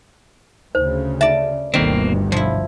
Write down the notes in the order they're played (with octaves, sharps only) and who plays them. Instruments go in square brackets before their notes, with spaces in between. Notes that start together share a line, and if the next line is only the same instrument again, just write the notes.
[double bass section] D2 C#3 [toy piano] C5
[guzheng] D5 A5 [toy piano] E5
[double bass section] G1 D2 G2 [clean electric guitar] B2 A#3 C4 [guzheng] D#3
[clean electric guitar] B1 [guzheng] F3 E4